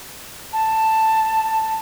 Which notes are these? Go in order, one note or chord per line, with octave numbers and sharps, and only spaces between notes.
A5